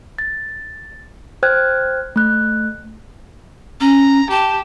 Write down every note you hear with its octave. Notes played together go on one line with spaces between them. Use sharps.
A6
C5 G5 F6 F#6 G#6
A3 F#6
C#4 A#5
G4 A5